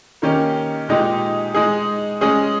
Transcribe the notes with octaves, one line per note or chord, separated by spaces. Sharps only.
D#3 A#3 C#4 G4
A#2 G#3 D#4 G4
G#3 D#4 G#4
G#3 C#4 G#4